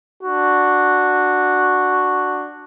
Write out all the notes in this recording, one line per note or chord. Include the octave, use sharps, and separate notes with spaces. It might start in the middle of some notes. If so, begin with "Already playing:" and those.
D4 F#4